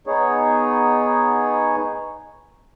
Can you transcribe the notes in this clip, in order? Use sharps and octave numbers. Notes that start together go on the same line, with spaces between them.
B3 D#4 G#4 C#5